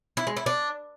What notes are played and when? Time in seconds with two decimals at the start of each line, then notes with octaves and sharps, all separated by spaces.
0.17 E4
0.27 G#3
0.37 E4
0.46 D4